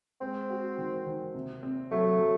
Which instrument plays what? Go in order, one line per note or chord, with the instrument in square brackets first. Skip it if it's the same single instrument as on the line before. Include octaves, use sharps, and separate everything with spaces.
[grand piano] G#3 [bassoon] C4
[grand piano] F#4
D#3
D#3
C3
C4
[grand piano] F#3 [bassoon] A3
[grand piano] F#3